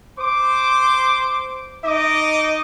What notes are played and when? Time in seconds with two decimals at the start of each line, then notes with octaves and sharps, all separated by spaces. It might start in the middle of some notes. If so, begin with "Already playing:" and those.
0.20 C5 D6
1.85 D#4 D#5 D6